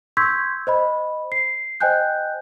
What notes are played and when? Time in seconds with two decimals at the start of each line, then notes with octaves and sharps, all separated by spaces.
0.17 C6 C#6 E6 G6 G#6 B6
0.67 C5 D#5 B5
1.32 C7
1.80 C5 D#5 G5 G#5 F#6 G6